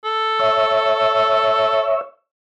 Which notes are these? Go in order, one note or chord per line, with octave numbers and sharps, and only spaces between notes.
A4
C#5 E5